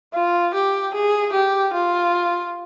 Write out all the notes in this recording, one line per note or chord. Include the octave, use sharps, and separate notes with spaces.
F4
G4
G#4
G4
F4